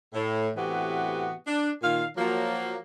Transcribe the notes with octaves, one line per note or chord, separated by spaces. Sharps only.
A2
A2 C3 E3 B3 F#4 G4
D4
A#2 D#3 F4 F5
F3 F#3 A#3